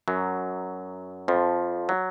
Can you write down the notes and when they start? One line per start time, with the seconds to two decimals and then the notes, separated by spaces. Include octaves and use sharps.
0.08 F#2 F#3
1.28 F2 F3
1.89 F#3